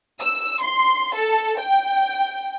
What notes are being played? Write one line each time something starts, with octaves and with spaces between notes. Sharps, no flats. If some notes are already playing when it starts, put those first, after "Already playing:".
E6
C6
A4
G5